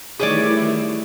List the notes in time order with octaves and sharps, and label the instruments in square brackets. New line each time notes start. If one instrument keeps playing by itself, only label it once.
[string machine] D#3 E4 [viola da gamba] E3 G3 A3 [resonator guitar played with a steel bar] G#4 C#5 D5